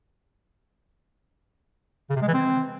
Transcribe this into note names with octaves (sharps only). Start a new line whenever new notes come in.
C#3
C3
G#3
E3
C4